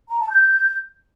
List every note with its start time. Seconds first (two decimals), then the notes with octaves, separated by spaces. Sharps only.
0.09 A#5
0.20 A5
0.31 G6